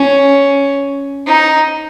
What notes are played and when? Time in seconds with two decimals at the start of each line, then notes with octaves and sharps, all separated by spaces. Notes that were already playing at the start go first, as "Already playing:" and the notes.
Already playing: C#4
1.27 D#4